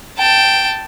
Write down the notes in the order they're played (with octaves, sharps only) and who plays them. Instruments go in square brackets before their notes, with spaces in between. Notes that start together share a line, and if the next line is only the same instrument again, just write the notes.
[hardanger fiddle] G5 A5